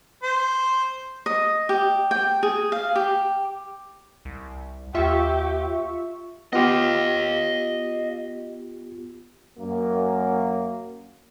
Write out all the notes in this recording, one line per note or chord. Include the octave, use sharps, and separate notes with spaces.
C5
D#5
G4
G5
G#4
F5
G4
C2
D#2 F4 G4 E5 C#6
B3 F4 G4 D#5 F5
F#2 A#3